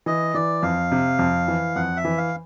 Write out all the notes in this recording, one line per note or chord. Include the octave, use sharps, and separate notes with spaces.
E3 D#5
E3 D5
F2 F5
C3
F2
E3
F2 F#5
E5
E3
F5